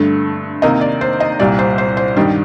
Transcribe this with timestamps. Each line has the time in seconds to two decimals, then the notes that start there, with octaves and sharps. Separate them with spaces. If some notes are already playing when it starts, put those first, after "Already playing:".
Already playing: G2 D3 A3
0.62 C3 D#3 A#3 D#4 D#5
0.81 D5
1.01 C5
1.20 D#5
1.39 C2 A#2 G3 D5
1.59 C5
1.78 C5
1.97 C5
2.16 G2 D#3 G3 G5